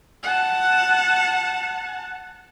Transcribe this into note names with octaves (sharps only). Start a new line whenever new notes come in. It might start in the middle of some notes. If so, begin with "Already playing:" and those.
F#5 A5